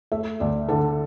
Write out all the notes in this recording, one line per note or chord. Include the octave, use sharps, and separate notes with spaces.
A3 E5
D2 D5
D3 A4